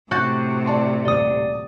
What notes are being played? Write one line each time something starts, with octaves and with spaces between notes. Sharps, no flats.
A2 C3 F#4 F#6 G6 A6
D5 A5 C6
D#1 D5 D#6